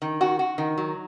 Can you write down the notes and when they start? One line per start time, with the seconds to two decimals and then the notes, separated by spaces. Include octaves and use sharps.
0.02 D#3
0.21 F#4
0.39 F#4
0.58 D#3
0.78 F#3